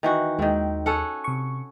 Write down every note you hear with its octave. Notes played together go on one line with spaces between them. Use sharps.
D#3 E3 F#4
D#2 D#3 G#3 C4
C#4 A4 F#5
C3 C#6